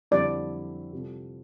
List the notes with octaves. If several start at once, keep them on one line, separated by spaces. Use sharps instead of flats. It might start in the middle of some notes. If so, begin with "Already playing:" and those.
F2 D3 G3 C4 E4 D5
C3 G3 C4 F4 A4